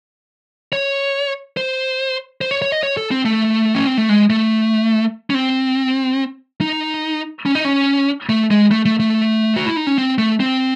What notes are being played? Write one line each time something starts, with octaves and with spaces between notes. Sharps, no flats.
C#5
C5
C5
C#5
C#5
D#5
C#5
A4
C4
A3
C#4
C4
A3
G#3
A3
C#4
C4
D#4
C#4
D#4
C#4
A3
G#3
A3
A3
A3
F#4
E4
D#4
C#4
C4
A3
C4